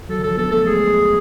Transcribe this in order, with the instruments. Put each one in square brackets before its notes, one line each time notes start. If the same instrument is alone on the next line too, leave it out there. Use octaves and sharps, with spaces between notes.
[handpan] F#3 [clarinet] A4
[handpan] D3
[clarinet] A4
[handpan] F3
[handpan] B3 [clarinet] A4
[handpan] A3 [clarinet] A4
[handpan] G#3 [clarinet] G#4